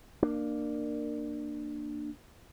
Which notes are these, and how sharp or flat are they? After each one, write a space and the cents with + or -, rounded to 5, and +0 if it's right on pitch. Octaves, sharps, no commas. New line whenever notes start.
A#3 +0 D4 +25